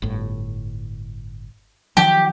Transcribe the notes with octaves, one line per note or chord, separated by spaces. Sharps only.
G1 A2
D#3 F3 F#3 G4